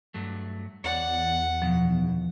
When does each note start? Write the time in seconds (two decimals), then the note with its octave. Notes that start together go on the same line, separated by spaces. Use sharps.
0.14 G2 F#3 A3
0.84 E2 C#5 D5 F#5
1.62 F#2 B2 D#3 F3